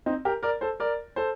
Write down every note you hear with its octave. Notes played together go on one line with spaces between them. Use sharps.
C4 D#4
G4 A#4
A#4 D5
A4 C5
A#4 D5
A4 C5